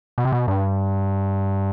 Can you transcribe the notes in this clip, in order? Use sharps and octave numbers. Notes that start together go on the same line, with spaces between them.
B2
C3
B2
G2